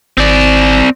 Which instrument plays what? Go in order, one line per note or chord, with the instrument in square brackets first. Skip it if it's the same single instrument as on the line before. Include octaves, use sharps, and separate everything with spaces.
[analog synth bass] G#1 [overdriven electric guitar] C4 D5